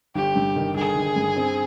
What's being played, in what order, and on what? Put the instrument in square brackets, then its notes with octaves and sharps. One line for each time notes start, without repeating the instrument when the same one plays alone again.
[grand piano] G1 [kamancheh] G4
[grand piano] G2
D#3
[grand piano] G1 [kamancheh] G#4
[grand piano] G1
G2
C4